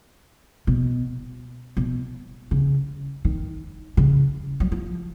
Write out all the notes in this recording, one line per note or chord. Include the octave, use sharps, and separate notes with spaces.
B2
B2
C#3
D#3
C#3
F#3
F3